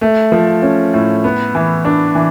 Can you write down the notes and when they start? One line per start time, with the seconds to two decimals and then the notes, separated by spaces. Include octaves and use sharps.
0.01 A3
0.32 F3
0.62 C#4
0.94 A2
1.24 B3
1.55 E3
1.85 D4
2.15 E3